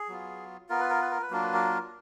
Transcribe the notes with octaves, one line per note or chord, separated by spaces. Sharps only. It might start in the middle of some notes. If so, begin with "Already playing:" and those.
Already playing: G#4
F#3 B3 F4
B3 F4 A#4
B4
A#4
B4
A#4
B4
F#3 A#3 D4 F4 A#4
B4
A#4